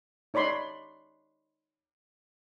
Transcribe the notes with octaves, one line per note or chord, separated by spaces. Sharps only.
D#4 C#5 D5 B5 C6